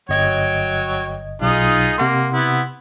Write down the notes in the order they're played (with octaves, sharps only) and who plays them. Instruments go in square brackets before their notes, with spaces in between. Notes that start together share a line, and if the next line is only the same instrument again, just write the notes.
[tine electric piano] G1 D#5 G#6 [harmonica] F#3 C#5 G5
[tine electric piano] B1 [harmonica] D#4 F4 G#4
[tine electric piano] C3 F#5 C6 [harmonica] A#3
[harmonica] B3 E4